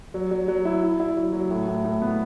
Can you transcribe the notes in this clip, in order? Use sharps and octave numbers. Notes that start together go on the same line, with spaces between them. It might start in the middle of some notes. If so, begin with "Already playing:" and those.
F#3
F#3
F#3
E4
E4
E4
F#3
F#3
A2
A2
A2
B3